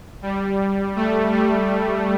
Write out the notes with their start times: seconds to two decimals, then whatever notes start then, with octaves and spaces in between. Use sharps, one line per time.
0.22 G3
0.96 A3
1.32 G3